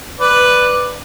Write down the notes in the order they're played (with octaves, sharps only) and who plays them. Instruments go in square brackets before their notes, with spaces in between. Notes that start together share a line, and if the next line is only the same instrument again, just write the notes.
[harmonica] B4 D5